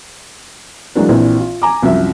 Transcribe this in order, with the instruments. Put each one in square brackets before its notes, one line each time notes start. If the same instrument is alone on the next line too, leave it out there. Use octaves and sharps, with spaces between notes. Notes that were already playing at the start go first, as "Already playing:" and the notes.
[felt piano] E3 F#3 G#3 A#3 D4
A#1 A#2 E3 C4
F4
G#5 A#5 D6
C2 F#2 F3 E5